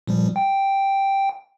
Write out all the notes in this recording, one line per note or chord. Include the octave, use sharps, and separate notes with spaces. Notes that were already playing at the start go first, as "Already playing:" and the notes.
A#2 F3 G3
G5